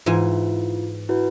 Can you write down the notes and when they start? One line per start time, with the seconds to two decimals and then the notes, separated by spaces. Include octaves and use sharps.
0.06 G#2 E3 E4 F4 G#5
1.09 E4 F#4 B4